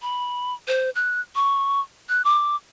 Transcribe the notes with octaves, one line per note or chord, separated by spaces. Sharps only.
B5
C5
F#6
C#6
F#6
D6